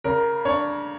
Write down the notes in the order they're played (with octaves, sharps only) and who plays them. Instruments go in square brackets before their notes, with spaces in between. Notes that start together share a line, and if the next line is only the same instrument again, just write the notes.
[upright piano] C#3 [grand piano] A#4
[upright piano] D4 [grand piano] C#5